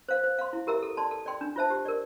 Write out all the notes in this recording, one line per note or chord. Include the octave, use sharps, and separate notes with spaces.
C5 F5
C5
F5 C6
E4
G4 A#4 E5 A#5
A4
D5 A5 C6
A4
D5 G5 C6
D4
F4 C5 E5 A5
G4
A#4 D5